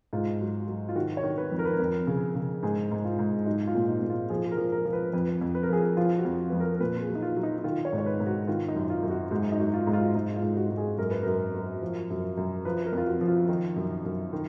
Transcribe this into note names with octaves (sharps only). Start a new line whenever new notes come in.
G#2 F4
F#3
F#3
F4
D#3 F#4
C#5
D#3
B4
F2
A#4
B4
A#4
F2
C#3
C#3
G#2 G#4
G#2
F4
G#2
F#3 D#4
F4
A#2
D#4
A#2
F4
F3 G#4
G#4
A#4
F3
A#4
F3
B4
F2 B4
F2
B4
A#4
F3 G#4
A#4
F3 F4
F#4
F2
F2 B4
A#4
A#4
A#2 B4
G#4
F#3
D#4
F4
F#3
D#4
D#4
D#3 F4
C#5
G#2
C#5
B4
G#2
F#4
D#3 F4
D#4
F#2
F4
F#2
F#4
G#2 F#4
D#4
F#3
F4
G#2
F4
G#2 D#4
F4
G#2
F#4
G#2
G#4
F#2 A#4
B4
F#2 A#4
F#3
F3
F#2
F#2
F3 B4
A#4
F2 F4
F#4
F3
F4
D#3 D#4
F#2
F#2
D#3